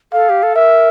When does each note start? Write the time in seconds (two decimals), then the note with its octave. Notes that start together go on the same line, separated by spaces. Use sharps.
0.13 A4 F5
0.29 G4
0.43 A4
0.56 A#4 E5